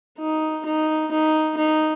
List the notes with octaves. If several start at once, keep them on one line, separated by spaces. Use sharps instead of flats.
D#4
D#4
D#4
D#4